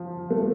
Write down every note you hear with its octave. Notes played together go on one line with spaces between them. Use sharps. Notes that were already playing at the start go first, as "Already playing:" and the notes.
Already playing: F3
A3